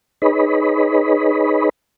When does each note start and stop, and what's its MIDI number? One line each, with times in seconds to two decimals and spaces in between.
0.22 1.69 63
0.22 1.69 68
0.22 1.69 71
0.22 1.69 73
0.22 1.69 75
0.22 1.69 83